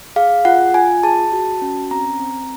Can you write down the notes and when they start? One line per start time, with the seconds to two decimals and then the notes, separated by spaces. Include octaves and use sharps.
0.16 G#4 F5
0.45 F4 F#5
0.74 F4 G#5
1.03 G#4 A5
1.32 F#4
1.62 C#4
1.91 C4 A#5
2.20 C4